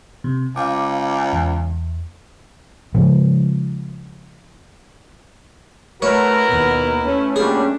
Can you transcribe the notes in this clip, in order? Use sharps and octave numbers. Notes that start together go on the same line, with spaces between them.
C3
C#2 F5 D6
E2
C#3 F3 G#3
A3 E4 F#4 A#4 B4 C#5
D#2 B2
A3 C#4
F#2 A#2 G3 D4 G#4